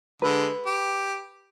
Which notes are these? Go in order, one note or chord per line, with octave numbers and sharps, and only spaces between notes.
D3 G#3 B4
G4